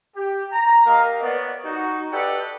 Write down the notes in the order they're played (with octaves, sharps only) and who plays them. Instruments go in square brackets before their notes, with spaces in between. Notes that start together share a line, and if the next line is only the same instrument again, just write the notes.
[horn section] G4
A#5
A#3 G4 D#5 F5
B3 C#5 D5
D#4 F#4
G4 A4 B4 D5 D#5 F#5